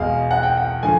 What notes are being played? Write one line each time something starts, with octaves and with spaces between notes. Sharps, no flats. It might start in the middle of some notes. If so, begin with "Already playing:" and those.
Already playing: E2 B2 G#3 F5
F#5
G5
F#5
D3 F3 A3 G#5